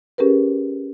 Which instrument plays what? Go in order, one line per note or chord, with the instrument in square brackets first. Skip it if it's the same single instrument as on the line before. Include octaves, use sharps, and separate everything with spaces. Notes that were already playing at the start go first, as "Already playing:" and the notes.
[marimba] C#4 G4 G#4 A#4 B4